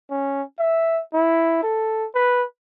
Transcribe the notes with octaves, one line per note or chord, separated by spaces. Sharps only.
C#4
E5
E4
A4
B4